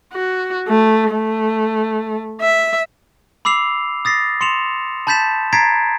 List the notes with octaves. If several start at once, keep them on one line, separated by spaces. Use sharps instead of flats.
F#4
A3
A3
E5
B5 D6 E6 C7 F7
D#6 A6 A#6 C7
C6 C#7 E7 F7
A5 B5 G6 A6 B6 E7
A#5 G#6 A6 B6 C7 D7